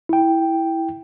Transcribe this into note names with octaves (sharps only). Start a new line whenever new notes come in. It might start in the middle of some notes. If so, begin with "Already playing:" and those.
E4 G5